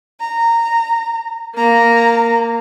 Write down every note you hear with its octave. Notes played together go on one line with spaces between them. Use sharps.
A#5
A#3 A#5